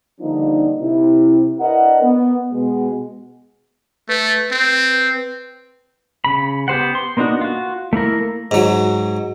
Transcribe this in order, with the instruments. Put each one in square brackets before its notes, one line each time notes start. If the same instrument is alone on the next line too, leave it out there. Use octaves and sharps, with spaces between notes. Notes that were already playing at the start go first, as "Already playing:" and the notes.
[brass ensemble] D3 F3 G3 A#3 D4 D#4
C3 E4
D4 E4 A#4 B4 D#5 F#5
B3
B2 G#3 B3
[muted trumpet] A3 [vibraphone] B4
[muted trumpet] C4
[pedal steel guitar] C#3 B5
B3 G4 C5 F#5
C6
A#3 B3 D4 D#4 F#4
F4 F#4
A3 A#3 E4 A#4
[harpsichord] G#2 F#3